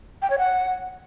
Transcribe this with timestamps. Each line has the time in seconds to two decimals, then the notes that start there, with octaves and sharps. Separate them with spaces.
0.22 G5
0.30 C#5
0.38 F#5